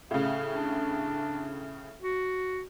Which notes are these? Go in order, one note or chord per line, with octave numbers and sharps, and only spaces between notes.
A2 C#3 F5
D4
F#4